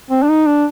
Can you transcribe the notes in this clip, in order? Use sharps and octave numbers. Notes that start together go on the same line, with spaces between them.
C4
D4
D#4
D4